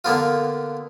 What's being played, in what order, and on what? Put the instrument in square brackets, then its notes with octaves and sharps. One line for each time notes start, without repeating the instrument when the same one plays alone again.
[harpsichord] D3 A#3 B3 F4